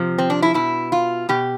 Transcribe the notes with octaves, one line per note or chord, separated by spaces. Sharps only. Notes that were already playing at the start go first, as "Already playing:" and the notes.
Already playing: C3 F3
C4
D4
E4
B2 E4
F4
B2 G4